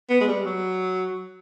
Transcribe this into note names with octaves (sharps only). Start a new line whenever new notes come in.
B3
G#3
G3
F#3